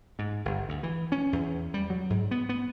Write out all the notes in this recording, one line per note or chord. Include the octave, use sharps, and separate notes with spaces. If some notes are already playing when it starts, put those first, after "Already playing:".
G#2
G1
D2
E3
C#4
E2
G3
F#3
G#2
B3
B3